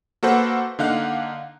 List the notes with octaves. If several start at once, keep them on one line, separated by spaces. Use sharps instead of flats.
A#3 F#4 A4 B4 C5 F#5
D3 A#3 D#4 F5 F#5 F#6